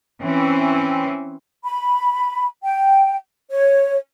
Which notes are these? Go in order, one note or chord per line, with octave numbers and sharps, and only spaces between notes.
E3 C4 C#4
B5
G5
C#5